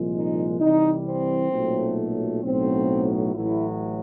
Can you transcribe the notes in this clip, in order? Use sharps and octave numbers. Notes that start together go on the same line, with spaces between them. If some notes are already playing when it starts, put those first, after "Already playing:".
Already playing: C2 A#2 F3 G#3
D#4
C2 C3 E3 G3 D#4
C4
B1 A#2 F#3 A3
B1 A2 F#3 C4
A1 A2 F#3 E4